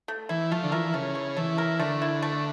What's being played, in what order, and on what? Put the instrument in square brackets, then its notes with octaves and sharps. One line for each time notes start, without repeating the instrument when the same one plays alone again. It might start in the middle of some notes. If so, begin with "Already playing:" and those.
[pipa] A3
[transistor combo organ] E3 [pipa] E4
[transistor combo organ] F3 [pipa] A3
[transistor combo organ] D3
[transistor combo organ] E3 [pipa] A#4
[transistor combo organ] C#3 [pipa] A3
[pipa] E4
[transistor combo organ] E3 [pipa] A3
[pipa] A#4
[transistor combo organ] D3 [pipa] A3
[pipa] E4
A3